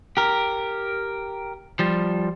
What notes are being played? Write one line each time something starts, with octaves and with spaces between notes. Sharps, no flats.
G4 A#4
F3 G3